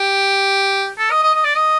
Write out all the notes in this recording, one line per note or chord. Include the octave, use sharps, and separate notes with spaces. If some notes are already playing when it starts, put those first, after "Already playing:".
Already playing: G4
A4
D#5
D#5
D#5
D5
D#5